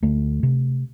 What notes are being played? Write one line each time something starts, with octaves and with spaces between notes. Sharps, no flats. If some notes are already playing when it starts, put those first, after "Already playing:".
D2 A3
C3